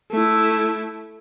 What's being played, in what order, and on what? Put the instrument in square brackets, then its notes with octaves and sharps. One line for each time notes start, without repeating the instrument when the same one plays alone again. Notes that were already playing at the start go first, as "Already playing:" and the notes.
[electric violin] A3 E4